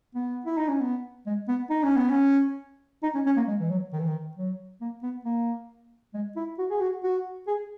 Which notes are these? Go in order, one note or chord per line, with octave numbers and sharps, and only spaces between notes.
B3
E4
D#4
C#4
B3
G#3
B3
D#4
C#4
B3
C#4
D#4
C#4
C#4
A#3
G#3
E3
F#3
D#3
E3
D#3
F#3
A#3
B3
A#3
G#3
E4
F#4
G#4
F#4
F#4
G#4